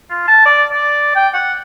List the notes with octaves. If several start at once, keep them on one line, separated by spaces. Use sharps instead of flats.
F4
A5
D5
D5
G5
F#5